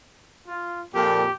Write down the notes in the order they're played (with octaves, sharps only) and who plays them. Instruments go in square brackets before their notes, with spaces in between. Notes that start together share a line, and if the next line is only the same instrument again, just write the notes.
[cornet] F4
[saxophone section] F2 A#2 [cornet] G4